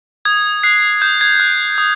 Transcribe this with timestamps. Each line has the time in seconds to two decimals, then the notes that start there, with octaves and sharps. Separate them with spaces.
0.25 D#6 G#6
0.63 F#6 C7
1.02 D#6 G6
1.21 G#6
1.40 F#6
1.78 D#6